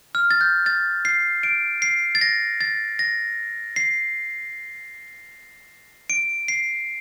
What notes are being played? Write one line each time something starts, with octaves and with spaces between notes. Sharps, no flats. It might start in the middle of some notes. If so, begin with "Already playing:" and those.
F6
A6
G6
A6
C7
D7
C7
A6
A#6
A6
A#6
C7
D7
C7